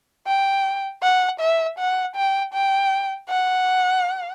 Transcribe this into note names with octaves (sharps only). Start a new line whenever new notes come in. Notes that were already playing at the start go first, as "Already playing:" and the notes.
G5
F#5
E5
F#5
G5
G5
F#5